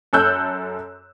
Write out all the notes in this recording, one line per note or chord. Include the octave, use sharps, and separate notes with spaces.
F#2 A4 E6 F#6 G6